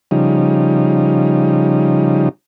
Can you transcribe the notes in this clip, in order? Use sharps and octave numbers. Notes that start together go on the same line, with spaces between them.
C#3 F3 G3 D#4